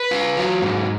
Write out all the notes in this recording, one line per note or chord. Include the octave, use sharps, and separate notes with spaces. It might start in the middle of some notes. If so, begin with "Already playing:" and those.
Already playing: B4
F4
F#3
G#2